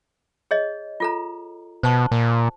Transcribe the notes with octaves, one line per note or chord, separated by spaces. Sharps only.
G#4 C#5 D#5
F4 A4 A#5
B2 C5 A5 C#6
A#2